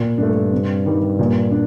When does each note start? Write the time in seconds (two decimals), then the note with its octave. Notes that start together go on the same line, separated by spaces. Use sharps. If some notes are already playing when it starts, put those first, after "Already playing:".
Already playing: A#2
0.18 G2 A3 D4
0.52 C3
0.86 D#3 G3
1.19 A#2
1.51 D4